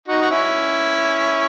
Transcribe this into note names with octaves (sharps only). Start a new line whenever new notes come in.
D#4 F#4
F#4
C#4 E4